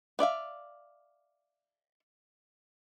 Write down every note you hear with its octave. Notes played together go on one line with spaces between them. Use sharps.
B3 D5 E5 F5